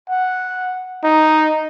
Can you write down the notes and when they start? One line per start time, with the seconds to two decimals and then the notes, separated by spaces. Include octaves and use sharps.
0.10 F#5
1.04 D#4